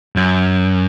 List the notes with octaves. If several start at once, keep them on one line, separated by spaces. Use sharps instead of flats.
F#2